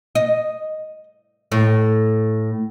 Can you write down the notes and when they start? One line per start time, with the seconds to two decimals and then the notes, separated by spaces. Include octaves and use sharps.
0.15 D#5
1.52 A2